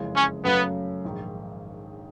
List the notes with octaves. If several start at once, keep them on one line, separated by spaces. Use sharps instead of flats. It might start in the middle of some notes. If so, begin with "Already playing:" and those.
Already playing: F#1 F2 C#3 E3 G#3
C#4
F#2 C#3 F#3 A3 B3
A#1 G#2 D#3